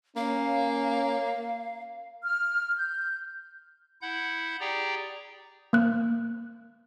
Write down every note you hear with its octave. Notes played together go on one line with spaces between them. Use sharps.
A#3 C#4 F5
F6
G6
E4 F#5 G6
G4 G#4 D5 G5 A#5
A#3 F#6